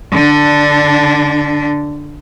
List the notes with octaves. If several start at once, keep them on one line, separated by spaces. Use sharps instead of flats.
D3 D4